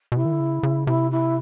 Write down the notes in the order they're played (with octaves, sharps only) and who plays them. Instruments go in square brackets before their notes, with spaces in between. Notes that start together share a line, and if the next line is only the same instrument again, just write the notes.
[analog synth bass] B2
[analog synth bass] C3 [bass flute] E4
[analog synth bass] D#3
D3
C#3
C#3
[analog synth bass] C3 [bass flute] E4
[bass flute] E4